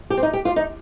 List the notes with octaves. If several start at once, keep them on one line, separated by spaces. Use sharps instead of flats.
G4
C4
D#4
G4
F4
D#4